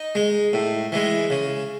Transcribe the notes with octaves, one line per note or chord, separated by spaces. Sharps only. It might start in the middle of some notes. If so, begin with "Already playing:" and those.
Already playing: D#4
G#3
A2
E3 G#3
C#3